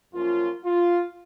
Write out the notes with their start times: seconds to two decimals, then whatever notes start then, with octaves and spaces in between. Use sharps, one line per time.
0.13 F#2 F3 A#3 C#4 F4
0.64 F4